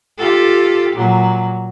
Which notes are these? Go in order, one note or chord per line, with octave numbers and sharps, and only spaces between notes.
F4 G4 A4
A#2 F#3